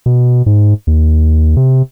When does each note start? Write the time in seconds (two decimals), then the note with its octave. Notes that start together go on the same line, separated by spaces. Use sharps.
0.06 B2
0.46 G#2
0.87 D#2
1.57 C3